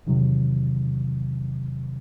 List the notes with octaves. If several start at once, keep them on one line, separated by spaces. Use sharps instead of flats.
E2 C3 D#3 F#3